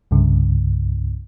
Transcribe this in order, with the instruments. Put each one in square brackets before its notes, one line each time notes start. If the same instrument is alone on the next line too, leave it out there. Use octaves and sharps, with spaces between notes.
[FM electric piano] C2 G2 C#3